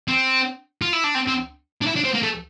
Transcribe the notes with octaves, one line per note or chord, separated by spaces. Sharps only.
C4
F4
E4
D4
C4
C4
D4
E4
D4
C4
A#3
A3